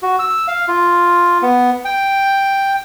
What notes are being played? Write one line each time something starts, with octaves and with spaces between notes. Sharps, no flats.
F#4
E6
F5
F4
B3
G5